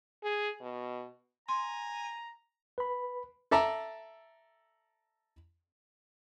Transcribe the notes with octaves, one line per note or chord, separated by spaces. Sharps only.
G#4
B2
G#5 A#5 C6
B4 B5
A4 D5 E5 A5 A#5